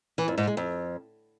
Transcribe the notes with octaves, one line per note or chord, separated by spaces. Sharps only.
E3
F2
G#2
G#3
F2